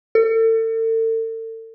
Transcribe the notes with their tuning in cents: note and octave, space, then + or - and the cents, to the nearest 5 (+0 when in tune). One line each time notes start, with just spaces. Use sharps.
A4 +40